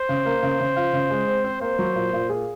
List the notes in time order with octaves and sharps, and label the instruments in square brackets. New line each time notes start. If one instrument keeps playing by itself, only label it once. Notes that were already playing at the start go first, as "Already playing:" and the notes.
Already playing: [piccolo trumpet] C5
[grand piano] C#3
A#3
C#3
C#3
F4
C#3
G#3
C4
C4
[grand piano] A#3 [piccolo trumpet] C5
[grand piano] F#3
A#2
A#2
G#4